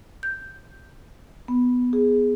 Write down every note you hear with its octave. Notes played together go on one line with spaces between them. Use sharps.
G6
B3
G#4